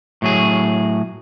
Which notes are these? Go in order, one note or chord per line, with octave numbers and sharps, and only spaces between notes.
A2 F#3 G#4